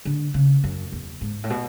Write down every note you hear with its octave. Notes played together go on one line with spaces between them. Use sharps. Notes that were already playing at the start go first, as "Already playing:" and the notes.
D3
C#3
F#2
E2
G#2
A2
B2